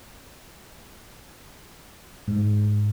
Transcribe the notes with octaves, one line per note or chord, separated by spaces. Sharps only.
G#2